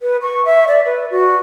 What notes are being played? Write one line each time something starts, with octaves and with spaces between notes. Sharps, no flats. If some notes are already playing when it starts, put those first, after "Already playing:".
B4
C#6
E5
D5
B4
F#4